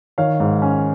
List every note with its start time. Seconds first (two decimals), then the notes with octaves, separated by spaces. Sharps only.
0.18 D#3 C#5 F5
0.40 G#2
0.62 C#4